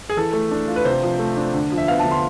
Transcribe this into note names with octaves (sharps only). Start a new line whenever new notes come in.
G#4
E3 A4
A3
D4
F4
B4
C3 C5
F3
A3
D4
D3
F3
E5
B3 F5
A5
D3
C6